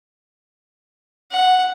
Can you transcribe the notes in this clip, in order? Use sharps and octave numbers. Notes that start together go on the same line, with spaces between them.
F#5